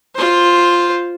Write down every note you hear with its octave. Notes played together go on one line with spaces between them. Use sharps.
F4 C5